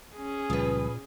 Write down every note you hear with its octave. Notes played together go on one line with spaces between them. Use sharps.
C#4 G#4
C#2 A#2 F3 G3 B3 B4